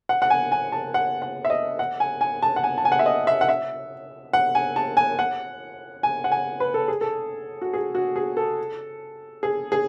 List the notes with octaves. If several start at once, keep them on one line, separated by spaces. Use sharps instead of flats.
F#5
F#5
G#5
G#5
A5
F#5
F#5
E5
D#5
F#5
G#5
G#5
A5
F#5
G#5
A5
G#5
F#5
E5
D#5
E5
F#5
E5
F#5
G#5
A5
G#5
F#5
G#5
F#5
G#5
B4
A4
G#4
A4
F#4
G#4
F#4
G#4
A4
G#4
G#4